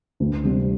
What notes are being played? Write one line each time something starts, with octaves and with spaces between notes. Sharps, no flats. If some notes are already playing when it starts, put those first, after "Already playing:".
D2
C3 G3 C4